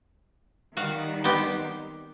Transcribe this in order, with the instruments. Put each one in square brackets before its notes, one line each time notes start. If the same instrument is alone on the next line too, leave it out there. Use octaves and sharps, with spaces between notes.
[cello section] D#3 G3 [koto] F#4 F5
[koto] B3 C4 G4